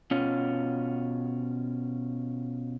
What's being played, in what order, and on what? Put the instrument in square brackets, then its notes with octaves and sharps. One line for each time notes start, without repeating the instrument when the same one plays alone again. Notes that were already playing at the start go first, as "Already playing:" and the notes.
[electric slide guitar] B2 C#4 F4